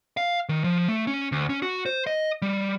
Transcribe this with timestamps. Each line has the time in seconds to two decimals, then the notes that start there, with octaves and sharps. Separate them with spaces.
0.17 F5
0.49 D#3
0.64 F3
0.89 A3
1.07 C#4
1.32 D2
1.49 C#4
1.62 F#4
1.86 C5
2.07 D#5
2.42 G3